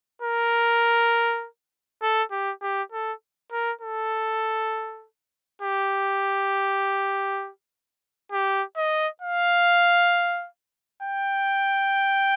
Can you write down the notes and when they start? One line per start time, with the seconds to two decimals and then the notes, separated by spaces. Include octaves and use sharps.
0.22 A#4
2.02 A4
2.32 G4
2.62 G4
2.92 A4
3.52 A#4
3.81 A4
5.62 G4
8.32 G4
8.77 D#5
9.22 F5
11.02 G5